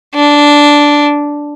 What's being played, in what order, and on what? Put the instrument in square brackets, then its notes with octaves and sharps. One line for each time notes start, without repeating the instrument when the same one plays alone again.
[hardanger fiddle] D4